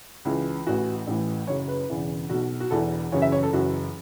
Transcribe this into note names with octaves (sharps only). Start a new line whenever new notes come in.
C#2 C#3 E3
A1 A2 E3 F#4
A1 A2 E3
F#1 F#2 C#3 C#5
B4
E1 E2 C#3 E3
B1 B2 F#4
F#4
E1 E2 E3 A4
F#1 F#2 C#3 E3 C#5
E5
C#5
A4
F#1 F#2 E3 F#4